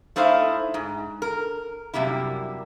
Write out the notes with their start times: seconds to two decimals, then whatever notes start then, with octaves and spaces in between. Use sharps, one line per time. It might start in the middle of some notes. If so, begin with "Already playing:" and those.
0.16 A3 D#4 E4 C5 F5
0.74 G#2
1.22 A#4
1.94 F#2 C3 G3 A#3 E4